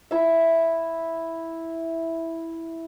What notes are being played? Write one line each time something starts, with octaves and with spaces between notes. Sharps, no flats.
E4 E5